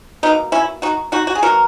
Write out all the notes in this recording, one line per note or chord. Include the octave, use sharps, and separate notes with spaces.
B2 A#3 B3 D#4
C#4 E4
D#4 F#4
D#4 F#4
F#4
G#4
B2 F#3 A#3 F#4 A#4